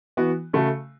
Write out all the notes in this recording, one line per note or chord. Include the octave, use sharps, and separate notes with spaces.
E3 B3 F#4
C#3 A3 F#4